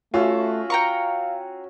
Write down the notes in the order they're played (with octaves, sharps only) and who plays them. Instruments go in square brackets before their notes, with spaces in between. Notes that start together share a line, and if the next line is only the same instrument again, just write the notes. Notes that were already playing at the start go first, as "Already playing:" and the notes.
[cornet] A3 [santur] C#4 F#4 E5 [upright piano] F4
[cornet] F5 [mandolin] G5 A#5 C#6